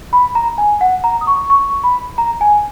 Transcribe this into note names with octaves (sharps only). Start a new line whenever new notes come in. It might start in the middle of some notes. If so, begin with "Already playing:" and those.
B5
A#5
G#5
F#5
A#5
D#6
C#6
C#6
B5
A#5
G#5